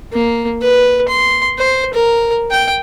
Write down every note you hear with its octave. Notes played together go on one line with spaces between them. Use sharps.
A#3
B4
C6
C5
A#4
G5